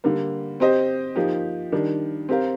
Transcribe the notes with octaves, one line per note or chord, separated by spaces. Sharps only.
D3 G3 A#3
C4 G4 C5 D#5
F3 A#3 D#4 G4
D#3 G3 D4
C4 G4 A#4 F5